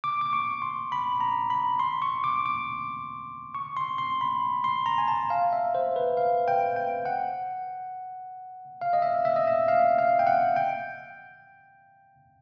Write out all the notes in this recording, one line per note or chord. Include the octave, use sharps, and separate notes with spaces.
D6
D6
C#6
C6
B5
A#5
B5
C6
C#6
D6
D6
C#6
C6
C6
B5
C6
A#5
G#5
A5
F5
E5
C5
B4
F5
G5
G5
F#5
F5
D#5
E5
E5
D#5
E5
F5
F5
G5
F#5
G5